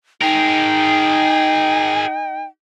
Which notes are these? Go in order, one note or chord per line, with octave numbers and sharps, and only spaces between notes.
D#4 G#4 A#4 G5